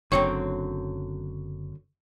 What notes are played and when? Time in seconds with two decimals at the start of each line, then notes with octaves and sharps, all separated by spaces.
0.12 F#1 F#2 D3 F#3 C4 C#5 C#6